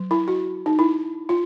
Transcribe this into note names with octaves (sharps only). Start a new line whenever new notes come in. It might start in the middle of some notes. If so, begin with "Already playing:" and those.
Already playing: F#3
E4
F#4
D#4
E4
F4